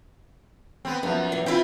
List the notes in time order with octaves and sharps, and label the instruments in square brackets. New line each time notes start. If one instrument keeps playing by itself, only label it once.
[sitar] B3 C4
[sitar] F#2 F3 [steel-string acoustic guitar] B3
[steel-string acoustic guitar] B2 E3
[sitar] C4 E4 [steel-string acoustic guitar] F4 E5 G5